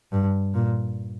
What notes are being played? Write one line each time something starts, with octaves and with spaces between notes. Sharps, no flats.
G2
A#2